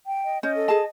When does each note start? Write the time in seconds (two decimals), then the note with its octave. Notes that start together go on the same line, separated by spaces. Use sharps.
0.07 G5
0.25 D#5
0.43 C#4 D#5 G6
0.55 A4
0.68 G#4 A5